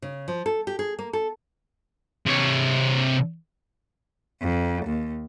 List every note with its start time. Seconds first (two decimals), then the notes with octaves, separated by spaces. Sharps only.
0.02 C#3
0.28 F3
0.46 A4
0.67 G4
0.79 G#4
0.99 A#3
1.13 A4
2.26 C3 C#5
4.41 F2
4.86 D#2